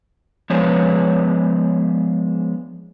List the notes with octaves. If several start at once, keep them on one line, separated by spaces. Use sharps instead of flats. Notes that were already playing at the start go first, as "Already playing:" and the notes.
F3 G#3 B3 D4 G#4 C#5